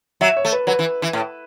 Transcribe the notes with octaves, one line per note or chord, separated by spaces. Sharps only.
F#3 E5
C#5
A3
B4
F#3 B4
E3
E3
A2